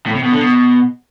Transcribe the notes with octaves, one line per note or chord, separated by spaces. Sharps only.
A2
C3
B2
D3
B2